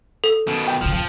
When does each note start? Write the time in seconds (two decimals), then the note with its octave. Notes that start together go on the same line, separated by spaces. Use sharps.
0.24 A4
0.48 B2 D#3
0.68 G5
0.82 G#2 C#3 F3
0.93 D#1 F3